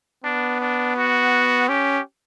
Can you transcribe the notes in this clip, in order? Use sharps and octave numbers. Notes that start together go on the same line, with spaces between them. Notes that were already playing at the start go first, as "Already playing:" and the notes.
B3 D4
D4
F#4
C#4 G4